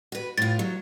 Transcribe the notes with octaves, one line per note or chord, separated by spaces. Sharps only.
F#4 B4
A2 F4 A6
F#3